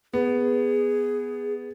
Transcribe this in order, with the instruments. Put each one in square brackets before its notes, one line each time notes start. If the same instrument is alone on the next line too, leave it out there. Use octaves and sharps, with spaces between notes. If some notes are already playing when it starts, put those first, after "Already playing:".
[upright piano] B3 [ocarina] G#4